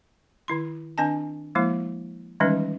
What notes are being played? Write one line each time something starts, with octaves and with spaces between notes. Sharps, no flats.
D#3 E4 C6
D#3 C4 D4 D#5 G#5 A5
F3 G#3 A#3 E4
D#3 E3 G3 G#3 C#4 D#4